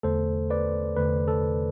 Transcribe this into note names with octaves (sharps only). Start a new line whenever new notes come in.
E2 D3 A3 A4 C5
B4 D5
E2 D3 A3 B4
A4